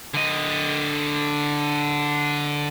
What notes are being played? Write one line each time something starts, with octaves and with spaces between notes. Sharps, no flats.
D3 D#5